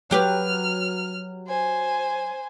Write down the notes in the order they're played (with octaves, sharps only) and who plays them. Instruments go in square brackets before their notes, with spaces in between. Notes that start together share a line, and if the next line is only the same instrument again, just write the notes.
[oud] F#3 G4 B4 [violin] F6
[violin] C5 G#5